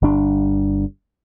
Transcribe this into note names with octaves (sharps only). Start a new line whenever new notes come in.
G1 G3 D4